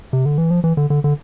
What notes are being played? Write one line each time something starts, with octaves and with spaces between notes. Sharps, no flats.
C3
D3
E3
F3
E3
D3
D3
D3